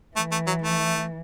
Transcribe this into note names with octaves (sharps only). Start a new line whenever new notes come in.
E3 A3
A3
F#3
A3